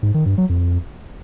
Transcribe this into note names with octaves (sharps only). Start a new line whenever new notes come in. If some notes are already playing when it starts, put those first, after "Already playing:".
G#2
D#3
G2
F#3
F2